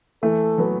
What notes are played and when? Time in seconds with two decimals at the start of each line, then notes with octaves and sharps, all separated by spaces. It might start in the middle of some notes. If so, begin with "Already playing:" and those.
0.23 E3 A3 A4
0.58 F#3 B3